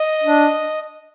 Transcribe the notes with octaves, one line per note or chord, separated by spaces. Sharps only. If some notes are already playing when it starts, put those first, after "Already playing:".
Already playing: D#5
D4